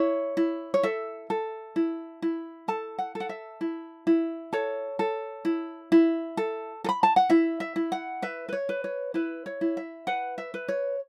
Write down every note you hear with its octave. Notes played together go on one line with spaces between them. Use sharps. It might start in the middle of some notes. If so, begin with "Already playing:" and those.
Already playing: E4 C#5
E4
C#5
A4 E5
A4
E4
E4
A4 A5
F#5
A4
F#5
E5
E4
E4
A4 C#5
A4
E4
E4
A4
A4
B5
A5
F#5
E4 E5
E5
E4
F#5
B4 E5
B4
C#5
B4
C#5
E4 B4
C#5
E4
E5
B4 F#5
E5
B4
C#5